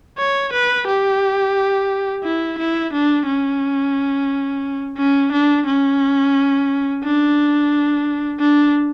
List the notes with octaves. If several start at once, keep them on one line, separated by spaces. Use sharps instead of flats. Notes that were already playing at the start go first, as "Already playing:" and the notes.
C#5
B4
G4
E4
E4
D4
C#4
C#4
D4
C#4
D4
D4